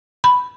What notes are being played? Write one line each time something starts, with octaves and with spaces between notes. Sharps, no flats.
B5